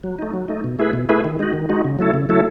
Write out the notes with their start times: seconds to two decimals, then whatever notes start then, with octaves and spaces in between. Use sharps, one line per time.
0.04 F#3
0.19 A3 D#4
0.33 F#3
0.48 A3 D#4
0.64 B2
0.79 A3 E4 G#4 B4
0.93 B2
1.09 A3 E4 G#4 B4
1.25 D#3
1.39 G#3 D#4 F#4
1.54 D#3
1.69 G#3 D#4 F#4
1.85 C#3
1.99 F#3 A3 E4 A4
2.14 C#3
2.29 F#3 A3 E4 A4